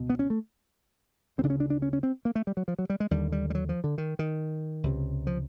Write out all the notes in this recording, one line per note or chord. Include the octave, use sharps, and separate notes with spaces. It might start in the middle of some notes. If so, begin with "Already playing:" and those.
Already playing: C#2 B2
B3
C#4
A3
D2 C4
C#3 D4
C#4
D4
D4
C#4
C#4
C4
A#3
A3
G3
F#3
F3
F#3
G3
G#3
D#2 D3 G3
G3
G3
F#3
F3
D3
D#3
D#3
C#2 C3
F3